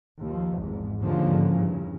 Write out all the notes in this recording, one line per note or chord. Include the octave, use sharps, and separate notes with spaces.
D#2 F3
G#1 E2 G#2
D#2 G#2 D3 F3 A#3 C#4
E2 G2 C#3